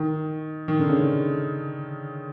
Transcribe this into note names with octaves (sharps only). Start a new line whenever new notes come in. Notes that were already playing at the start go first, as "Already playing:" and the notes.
Already playing: D#3
D#3
D3
C#3
D3